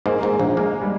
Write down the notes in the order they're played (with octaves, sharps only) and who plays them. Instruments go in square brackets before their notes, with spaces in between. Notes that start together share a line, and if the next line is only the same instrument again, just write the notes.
[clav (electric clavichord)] G#2 [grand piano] A#3
[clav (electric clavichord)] G#2
[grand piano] G#3
[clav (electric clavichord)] A#1
[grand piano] G#3 [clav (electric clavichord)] A#3
[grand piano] G3